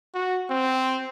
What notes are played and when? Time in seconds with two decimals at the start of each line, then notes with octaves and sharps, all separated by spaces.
0.14 F#4
0.50 C4